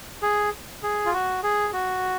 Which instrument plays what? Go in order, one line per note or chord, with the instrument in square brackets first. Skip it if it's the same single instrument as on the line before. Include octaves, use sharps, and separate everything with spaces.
[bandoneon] G#4
G#4
F4
F#4
G#4
F#4